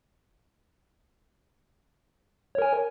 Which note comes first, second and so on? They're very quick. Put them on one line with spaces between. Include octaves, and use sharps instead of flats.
C#5 A#4 G#5